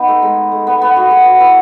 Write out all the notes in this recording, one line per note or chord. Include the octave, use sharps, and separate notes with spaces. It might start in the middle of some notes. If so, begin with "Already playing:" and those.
Already playing: B3 D#4
A3
G#3
A3
B3
B3
F#4
G#4
F#4
E4